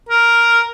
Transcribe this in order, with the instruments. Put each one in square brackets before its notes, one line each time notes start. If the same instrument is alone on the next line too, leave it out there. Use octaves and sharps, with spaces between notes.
[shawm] A#4